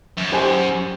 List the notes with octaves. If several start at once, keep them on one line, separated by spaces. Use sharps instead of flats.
F#2
G4 C5 G#5